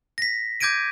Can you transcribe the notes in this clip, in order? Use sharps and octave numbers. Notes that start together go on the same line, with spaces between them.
A#6 B6
D6 G6 G#6 A#6 D7 D#7